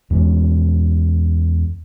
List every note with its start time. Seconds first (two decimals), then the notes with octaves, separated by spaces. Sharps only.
0.10 E2 G#3 C#4